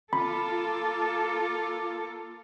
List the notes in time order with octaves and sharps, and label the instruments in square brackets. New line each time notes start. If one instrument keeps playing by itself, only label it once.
[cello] A#3 A4 [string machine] F4 [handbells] B5 [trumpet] D6